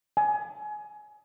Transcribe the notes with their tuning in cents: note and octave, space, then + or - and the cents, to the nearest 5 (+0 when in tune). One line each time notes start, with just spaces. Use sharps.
G#5 +20